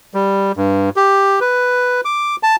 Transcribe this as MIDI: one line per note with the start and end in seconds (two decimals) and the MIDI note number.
0.14 0.52 55
0.57 0.90 43
0.96 1.40 67
1.40 2.01 71
2.05 2.36 86
2.43 2.56 81